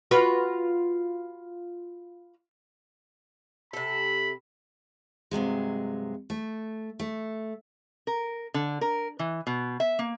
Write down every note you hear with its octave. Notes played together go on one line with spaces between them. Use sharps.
F4 F#4 B4
C3 A4 B5
G2 C3 F#3 G#3
A3
A3
A#4
D3
A#4
E3
B2
E5
A#3